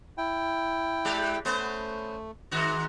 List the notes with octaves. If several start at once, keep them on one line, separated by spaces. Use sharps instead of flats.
E4 G5
G#3 G4 D5
A3 B3 C#4 C5
G#2 D#3 F#4